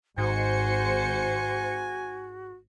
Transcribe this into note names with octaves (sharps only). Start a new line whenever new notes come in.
G#1 G#2 F#4 C5 G#5 C#7